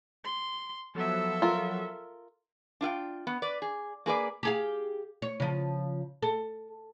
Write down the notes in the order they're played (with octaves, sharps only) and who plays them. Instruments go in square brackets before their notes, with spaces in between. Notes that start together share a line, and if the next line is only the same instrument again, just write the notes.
[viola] C6
[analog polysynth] F3 F#3 B3 [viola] A4 E5
[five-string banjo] F4 A#4
[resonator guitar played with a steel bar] D4 F4 F5 G5
B3
B4 D5
G#4
A#3 G#4 B4 D5
[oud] G4 G#4 F5
C#5
C#3 F3
A4